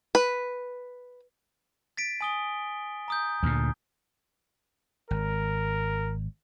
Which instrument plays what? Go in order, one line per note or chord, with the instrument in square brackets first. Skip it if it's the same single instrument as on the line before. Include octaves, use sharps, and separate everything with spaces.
[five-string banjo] B4
[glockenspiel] A6 B6 D7
G#5 D#6 G7
A#5 D#6 G6
[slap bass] D2 A#2
[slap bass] G#1 [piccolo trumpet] A#4